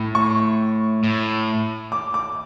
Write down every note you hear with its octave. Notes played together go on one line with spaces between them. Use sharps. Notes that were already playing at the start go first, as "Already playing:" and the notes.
Already playing: A2
C#6
A2
D6
D6